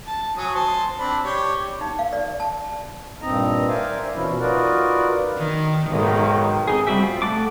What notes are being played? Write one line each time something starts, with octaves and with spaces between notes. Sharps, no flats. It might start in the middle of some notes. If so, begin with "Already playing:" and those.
A5
F#3 G#5 D#6
C5 A5
C4 D4 B5
G4 C#5 D5
D#4
F5
D5
A5
G2 A#2 C4 D#4 D#5 A#5
A#4 C5 D5 E5 F5 G#5
B2 E3 F3 C#4 E4
D#4 F4 F#4 A#4 B4 D5
D#3
B1 G#2 D#3
C4 D#4 G#4
G3 C4 F#4 G4 E5
F4
A3 F#5 A5 D6